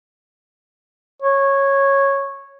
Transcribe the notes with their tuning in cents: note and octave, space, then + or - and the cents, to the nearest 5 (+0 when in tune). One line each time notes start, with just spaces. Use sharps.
C#5 -10